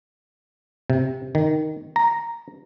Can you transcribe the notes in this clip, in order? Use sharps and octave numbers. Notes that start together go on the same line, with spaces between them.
C3
D#3
A#5